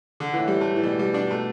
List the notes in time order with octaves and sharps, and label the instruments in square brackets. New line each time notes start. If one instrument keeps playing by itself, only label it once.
[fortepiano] D3
[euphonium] A2 [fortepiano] E3
[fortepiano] G3
A3
E3
[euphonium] B2 [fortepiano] G3
[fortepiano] G3
D4
A3